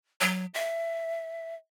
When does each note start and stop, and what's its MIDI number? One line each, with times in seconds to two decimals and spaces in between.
0.21 0.46 54
0.54 1.54 76